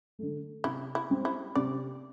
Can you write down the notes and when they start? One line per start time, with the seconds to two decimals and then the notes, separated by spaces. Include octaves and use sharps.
0.19 D3 A3
0.64 C3 E4
0.95 E4
1.10 G3 C4 G4
1.25 E4
1.55 C3 D5